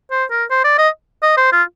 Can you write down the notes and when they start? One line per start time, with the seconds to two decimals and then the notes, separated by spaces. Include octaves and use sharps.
0.11 C5
0.30 A#4
0.50 C5
0.64 D5
0.78 D#5
1.22 D#5
1.37 C5
1.52 F4